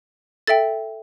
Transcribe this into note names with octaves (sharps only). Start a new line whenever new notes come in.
A4 E5 G5 A6